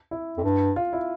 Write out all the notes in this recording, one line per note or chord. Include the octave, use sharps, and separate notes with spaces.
E4
F2
G2
F4
E4